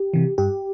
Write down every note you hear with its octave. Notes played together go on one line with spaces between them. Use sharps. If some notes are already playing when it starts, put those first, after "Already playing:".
Already playing: G4
C3 E3
G2 G4